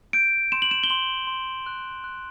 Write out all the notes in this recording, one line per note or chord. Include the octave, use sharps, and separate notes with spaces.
G6 D7
C6 E7
F#7
E7
G7
C6 F#7
C6
F#6
F#6